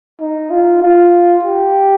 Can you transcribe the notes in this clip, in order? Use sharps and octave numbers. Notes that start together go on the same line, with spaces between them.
D#4
F4
F4
G4